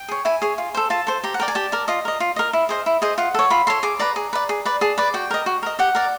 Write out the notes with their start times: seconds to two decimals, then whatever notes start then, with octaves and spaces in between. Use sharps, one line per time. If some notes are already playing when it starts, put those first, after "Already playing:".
Already playing: G5
0.08 G#4 C#5
0.25 E4 G#5
0.42 G#4 C#5
0.58 F4
0.75 A4 C5
0.90 F4 A5
1.07 A4 C5
1.24 G4 A#5
1.34 F#5
1.40 A#4 D5 G5
1.48 G#5
1.55 G4 A5
1.72 A#4 D5
1.88 F4 D#5
2.05 A#4 D#5
2.20 F4
2.36 A#4 D#5
2.53 E4
2.69 G#4 C5 D#5
2.86 E4
3.02 G#4 C5 D#5
3.18 F4 F#5
3.34 A4 C#5
3.50 F4 B5
3.67 A4 C#5 C6
3.83 G#4 D6
3.99 B4 D5 A#5
4.16 G#4
4.33 B4 D5
4.49 G#4
4.65 B4 D5
4.81 G#4 A5
4.98 B4 D5
5.14 F#4 G5
5.31 A#4 D#5
5.46 F#4
5.63 A#4 D#5
5.79 G4 F#5
5.95 A#4 D5